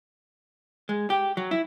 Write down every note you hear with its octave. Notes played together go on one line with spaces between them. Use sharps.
G#3
G4
F#3
E4